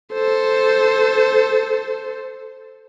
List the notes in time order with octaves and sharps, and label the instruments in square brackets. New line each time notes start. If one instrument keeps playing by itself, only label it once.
[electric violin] A4 C5